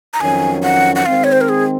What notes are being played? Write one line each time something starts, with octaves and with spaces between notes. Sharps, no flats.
A#5
F2 D#3 F#3 C#4 G#5
F#5
F#5
D#3 G#3 C4 F5
C#5
C5
A#4
G#4